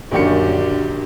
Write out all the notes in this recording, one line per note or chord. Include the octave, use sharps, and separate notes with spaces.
A#1 F#2 D3 D#3 F#4 G4 C#7